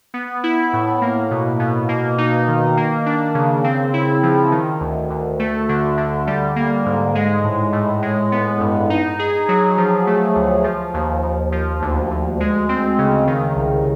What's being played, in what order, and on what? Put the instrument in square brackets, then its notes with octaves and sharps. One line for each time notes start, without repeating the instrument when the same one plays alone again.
[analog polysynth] B3
E4
A2
A#3
B2
B2
A#3
D#4
D#3
A#3
D4
C#3
C4
E4
F3
D#3
D2
D2
A3
D3
D3
G3
A#3
G#2
G#3
A2
A2
G#3
B3
G2
D#4
G#4
F#3
F3
A3
D2
F3
D#2
D#2
F3
D2
D2
G#3
C4
C#3
D#3
C2